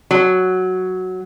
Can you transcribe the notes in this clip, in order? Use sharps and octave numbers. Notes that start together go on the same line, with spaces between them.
F#3